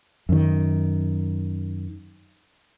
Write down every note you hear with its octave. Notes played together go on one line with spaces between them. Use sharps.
F#2 D#3